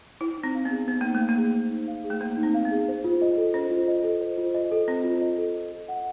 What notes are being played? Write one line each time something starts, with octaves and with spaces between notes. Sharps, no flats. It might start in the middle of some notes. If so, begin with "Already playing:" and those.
E4 C5
D#4
C4
F5
B3
G#4
B3 C5
A#3 D#4
A3
F5
A#3
G#4
C5
D#4
F5
G#4
A3
A#3 C5
D#4
C4
F5
B3
G#4
C5
F4
D#5
A4
C#4 C5
F4
D#5
A4
C5
F4
D#5
A4
C4 C5
F4
D#5
A4
D#5
A4
F#5